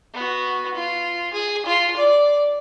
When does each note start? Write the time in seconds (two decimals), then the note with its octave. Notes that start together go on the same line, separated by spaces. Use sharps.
0.14 B3 F#4
0.75 F4
1.33 G#4
1.66 F4
1.96 D5